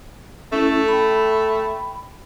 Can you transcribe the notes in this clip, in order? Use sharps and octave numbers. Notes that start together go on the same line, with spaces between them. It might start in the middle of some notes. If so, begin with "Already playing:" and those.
A3 C#4 E4 A4
G5 B5